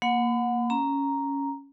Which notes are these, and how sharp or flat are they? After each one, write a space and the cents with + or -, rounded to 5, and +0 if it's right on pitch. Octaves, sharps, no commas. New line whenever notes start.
A#3 +0 F#5 -25 B5 +35
C#4 +0 A#5 +0